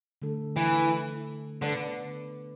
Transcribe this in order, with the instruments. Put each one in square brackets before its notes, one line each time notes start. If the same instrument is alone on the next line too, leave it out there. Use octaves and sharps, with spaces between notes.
[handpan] D3 A3 D4 A4
[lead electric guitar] E3
[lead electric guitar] D3 [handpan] B3 D4 B4 D5